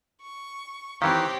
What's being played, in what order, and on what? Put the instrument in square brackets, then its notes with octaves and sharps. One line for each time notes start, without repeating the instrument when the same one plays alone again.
[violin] C#6
[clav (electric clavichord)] D#3 E3 [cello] C4 [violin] G4 C#5 [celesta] F5 B6